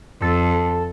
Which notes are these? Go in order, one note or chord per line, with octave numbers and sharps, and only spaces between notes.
F2 A4